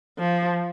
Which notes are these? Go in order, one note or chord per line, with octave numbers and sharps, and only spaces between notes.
F3